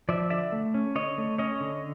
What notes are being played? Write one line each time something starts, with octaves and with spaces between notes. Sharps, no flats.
F3 D5 E5
D3 D5 E5
A3
C#4
D3 C#5 D#5
A3
C#4 C#5 D#5
D3